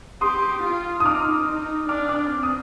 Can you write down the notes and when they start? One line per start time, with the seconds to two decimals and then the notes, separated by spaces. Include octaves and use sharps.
0.21 G4 C6 D#6
0.63 F4
1.00 D#6
1.05 D#4 D6 F6
1.47 D#4
1.89 D4 D6 F6
2.09 D6 F6
2.30 C4
2.43 D#6